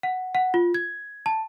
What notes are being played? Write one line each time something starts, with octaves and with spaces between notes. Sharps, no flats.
F#5
F#5
F4
G#6
A5